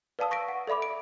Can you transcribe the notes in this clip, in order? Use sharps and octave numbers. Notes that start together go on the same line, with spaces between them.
B4 D5 F5 A5 D#6 E6
C#6 A#6 B6 D7
F#5
A4 D5 E5 B5 D6
D7